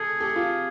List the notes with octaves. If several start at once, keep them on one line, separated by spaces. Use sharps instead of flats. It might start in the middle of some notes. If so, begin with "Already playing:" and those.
Already playing: G#4 A4
G4 A4
F4 G4